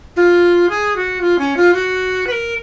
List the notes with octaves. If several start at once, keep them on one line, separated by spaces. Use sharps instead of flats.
F4
G#4
F#4
F4
C#4
F4
F#4
B4
A#4